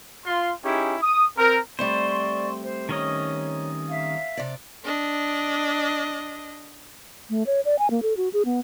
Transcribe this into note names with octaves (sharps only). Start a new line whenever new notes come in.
F4 C6
C#4 D#4 E4 G4 G#4
D#6
C4 A#4
G3 A3 C4 C5 D5 C6 C#6
C5
D#3 C#4 C#5 D#5
E5 F5
C3 D5
D4 D#5
A3
C#5
D5
G#5
A#3
A4
F#4
G#4
B3